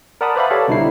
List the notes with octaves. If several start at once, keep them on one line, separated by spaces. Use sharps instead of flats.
A#4 D5 F#5 A5 B5 D#6
B4 C5 D5 E5 F5 B5
G4 A4 C#5 F5
C2 B2 D3 D#4 E4 C7